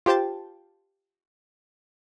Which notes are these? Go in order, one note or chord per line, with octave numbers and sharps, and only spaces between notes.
F4 G4 C5 G5 A5